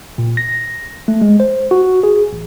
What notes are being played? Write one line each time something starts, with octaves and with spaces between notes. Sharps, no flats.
A#2
A#6
A3
G#3
C5
F#4
G#4
A1